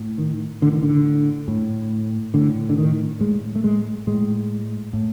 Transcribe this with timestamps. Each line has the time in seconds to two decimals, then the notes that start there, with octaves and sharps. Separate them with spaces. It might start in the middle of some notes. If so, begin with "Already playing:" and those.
Already playing: A2
0.18 D#3
0.62 A2 D3
0.72 D#3
0.83 D3
1.48 A2
2.34 A2 D3
2.69 D3
2.78 D#3
3.20 A2 G#3
3.55 A3
3.64 G#3
4.07 A2 G#3
4.93 A2